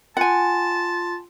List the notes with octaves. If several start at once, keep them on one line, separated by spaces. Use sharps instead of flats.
F4 F#5 G#5 A5 C6